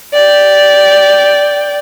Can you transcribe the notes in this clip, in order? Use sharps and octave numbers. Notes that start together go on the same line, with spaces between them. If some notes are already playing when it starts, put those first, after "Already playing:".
D5 G5